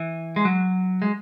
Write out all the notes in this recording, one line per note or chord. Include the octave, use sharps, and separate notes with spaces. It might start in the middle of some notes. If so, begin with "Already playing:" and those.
Already playing: E3
G#3
F#3
G#3